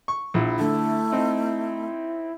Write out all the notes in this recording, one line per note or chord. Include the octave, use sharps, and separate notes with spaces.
C#6
A#1 E4
D3 A3
C4 D#4